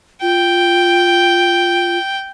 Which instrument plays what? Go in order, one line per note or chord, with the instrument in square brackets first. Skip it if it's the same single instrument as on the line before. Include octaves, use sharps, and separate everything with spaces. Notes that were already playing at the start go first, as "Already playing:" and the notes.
[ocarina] F4 [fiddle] G5